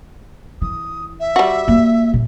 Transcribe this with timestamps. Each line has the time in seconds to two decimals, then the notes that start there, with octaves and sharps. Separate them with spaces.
0.62 E3 D#6
1.20 E5
1.36 G3 F#4
1.68 A#3
2.13 A#2